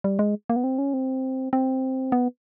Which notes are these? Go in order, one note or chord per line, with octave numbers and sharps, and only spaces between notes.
G3
G#3
A#3
B3
C4
C#4
C4
C4
B3